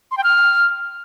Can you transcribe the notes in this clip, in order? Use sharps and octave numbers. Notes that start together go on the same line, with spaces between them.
C6
G5
F6